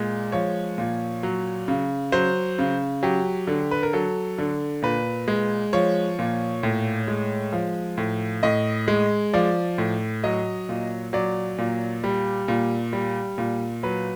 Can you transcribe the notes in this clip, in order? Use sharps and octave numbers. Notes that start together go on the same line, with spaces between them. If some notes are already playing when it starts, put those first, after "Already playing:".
Already playing: A#2 G#3
F3 C#5
A#2
F#3
C#3
F#3 C5
C#3
F#3 G4
D3
B4
A#4
F#3 A4
D3
A#2 B4
G#3
F3 C#5
A#2
A2
G#3
F3
A2
A2 D#5
G#3
F3 D5
A2
F#3 D#5
A#2
F#3 D5
A#2
G3
A#2
G3
A#2
F#3 B4